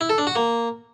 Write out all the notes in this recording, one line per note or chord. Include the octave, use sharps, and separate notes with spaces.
E4
A4
D4
F#4
A#3